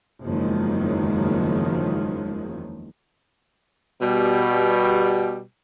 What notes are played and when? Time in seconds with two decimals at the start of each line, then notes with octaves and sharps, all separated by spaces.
0.23 F#1 E2 D#3 F3 F#3 G#3
4.00 B2 G3